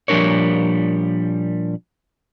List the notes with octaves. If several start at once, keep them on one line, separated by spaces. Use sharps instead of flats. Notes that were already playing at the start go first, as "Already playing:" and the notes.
A#2 F3 G3 D4 A#4 C#5